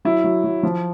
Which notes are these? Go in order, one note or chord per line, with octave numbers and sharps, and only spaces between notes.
F#3 E4
F#3
F#3
F3